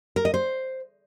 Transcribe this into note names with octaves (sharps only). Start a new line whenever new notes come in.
A#4
D#5
C5